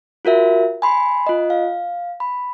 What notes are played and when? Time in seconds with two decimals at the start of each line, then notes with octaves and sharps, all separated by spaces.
0.25 F4 F#4 A#4 E5
0.82 G#5 B5 C6
1.27 F4 D#5
1.50 F5
2.20 B5